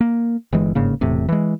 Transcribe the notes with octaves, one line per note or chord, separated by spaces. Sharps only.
A#3
G1 E3 G#3
G1 G#2 C#3 A#3
E1 E2 A2 C3
E3 G#3